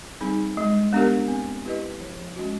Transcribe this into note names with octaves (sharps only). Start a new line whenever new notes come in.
G3 C4 D#4 G#4
G#3
B3 D4 G4 A#4
C4
E4 G4 B4 D#5
F3
G#3 C#4 F#4